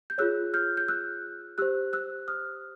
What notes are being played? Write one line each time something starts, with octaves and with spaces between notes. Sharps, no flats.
G6
F4 G#4 C#5 E6 F#6
F6 G6
G6
E6 F#6
G4 C5 E6 F#6
E6 F#6
D#6 F6